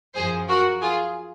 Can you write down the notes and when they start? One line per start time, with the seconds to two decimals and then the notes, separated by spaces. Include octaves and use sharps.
0.15 F#2 F3 G#4 C5
0.48 F#4 A#4
0.81 F4 G#4